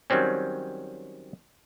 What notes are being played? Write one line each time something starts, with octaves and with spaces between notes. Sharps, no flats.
D#3 F#3 G3 C4 C#4